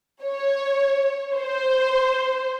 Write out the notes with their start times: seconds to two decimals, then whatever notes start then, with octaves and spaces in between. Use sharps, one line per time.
0.23 C#5
1.36 C5